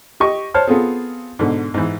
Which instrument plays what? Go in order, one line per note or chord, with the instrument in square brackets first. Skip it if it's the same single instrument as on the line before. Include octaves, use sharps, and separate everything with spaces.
[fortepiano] G4 D#5 C#6
C5 C#5 A5 F6
B3 C4 F4 G#4 A4
G#2 B2 D3
G#2 E3